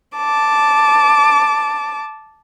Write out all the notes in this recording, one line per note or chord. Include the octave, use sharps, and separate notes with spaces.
A5 D6